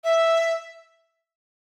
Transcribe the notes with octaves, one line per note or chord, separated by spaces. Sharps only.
E5